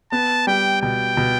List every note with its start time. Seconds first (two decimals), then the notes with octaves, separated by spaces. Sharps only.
0.12 B3 A5
0.47 G3 G5
0.82 B2 G5
1.17 B2